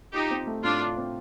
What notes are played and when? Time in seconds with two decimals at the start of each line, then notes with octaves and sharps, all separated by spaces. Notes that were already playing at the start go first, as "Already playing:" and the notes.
0.13 D#4 F4 G4
0.31 C4
0.47 A3
0.63 A2 D4 F4
0.80 F4
0.97 C4